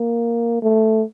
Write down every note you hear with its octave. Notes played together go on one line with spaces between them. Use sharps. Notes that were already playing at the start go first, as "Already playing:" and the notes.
Already playing: A#3
A3